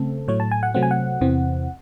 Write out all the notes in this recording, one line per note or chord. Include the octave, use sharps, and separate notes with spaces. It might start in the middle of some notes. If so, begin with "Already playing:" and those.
Already playing: C#3 A3 C4 A4
A2 F#3 A3 C#5
A5
G#5
F#5
C3 F#3 A3 C4 F#5
G#5
F#5
E2 C3 E3 C4